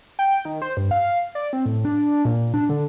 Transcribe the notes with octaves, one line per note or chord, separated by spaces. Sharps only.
G5
D#3
C5
G2
F5
D5
C4
A2
D4
A#2
D4
D3